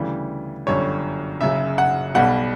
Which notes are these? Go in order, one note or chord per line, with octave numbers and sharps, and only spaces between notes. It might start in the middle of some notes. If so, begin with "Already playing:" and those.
Already playing: D2 C#3 E3 G3
G1 F#2 D3 G3 C#5
F#1 F#2 C#3 E5
F#5
B1 B2 G3 F#5